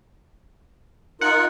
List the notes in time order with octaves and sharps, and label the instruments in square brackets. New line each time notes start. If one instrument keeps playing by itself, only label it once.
[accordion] D#4 F4 A#4 [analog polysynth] F#5